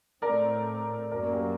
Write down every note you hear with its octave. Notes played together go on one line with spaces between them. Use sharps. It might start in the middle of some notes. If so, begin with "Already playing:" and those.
A2 A3 C4 A#4 D5
F#2 F#3 A#3 A#4 D5
G4 A#4